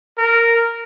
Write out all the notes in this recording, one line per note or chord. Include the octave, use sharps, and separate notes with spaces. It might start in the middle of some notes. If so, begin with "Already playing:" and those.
A#4